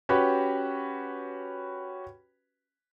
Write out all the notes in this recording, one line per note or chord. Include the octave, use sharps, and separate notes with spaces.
C#4 F#4 G4 B4 B5